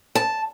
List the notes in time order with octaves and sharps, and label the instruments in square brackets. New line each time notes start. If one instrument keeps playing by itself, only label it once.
[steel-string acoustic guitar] A5